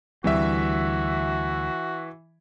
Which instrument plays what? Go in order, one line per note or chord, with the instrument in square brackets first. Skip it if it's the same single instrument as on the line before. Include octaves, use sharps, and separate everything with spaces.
[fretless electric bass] D2 G3 C4 [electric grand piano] E3 E5 [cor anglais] F#4